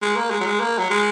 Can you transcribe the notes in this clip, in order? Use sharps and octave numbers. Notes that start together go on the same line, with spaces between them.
G#3
A#3
G#3
F#3
G#3
A#3
F#3
G#3